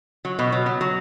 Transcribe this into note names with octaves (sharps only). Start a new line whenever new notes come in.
F#3
B2
F#3
F#3
F#3